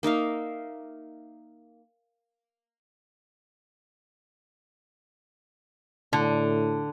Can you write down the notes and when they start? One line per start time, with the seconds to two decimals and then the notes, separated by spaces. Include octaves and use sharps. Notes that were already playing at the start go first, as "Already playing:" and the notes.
0.03 A#3 D#4 E5 F5
6.13 A2 D3